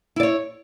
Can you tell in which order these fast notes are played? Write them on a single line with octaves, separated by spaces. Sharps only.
E4 D5 C#5